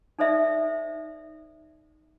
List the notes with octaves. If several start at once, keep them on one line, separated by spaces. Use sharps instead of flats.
D#4 A4 C5 D5 E5